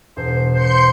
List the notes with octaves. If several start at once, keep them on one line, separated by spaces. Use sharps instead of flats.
E1 C5
C5 C6 G6 C#7